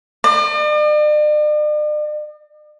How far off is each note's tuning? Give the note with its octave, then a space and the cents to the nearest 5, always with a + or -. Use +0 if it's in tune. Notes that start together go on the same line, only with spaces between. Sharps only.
D5 +45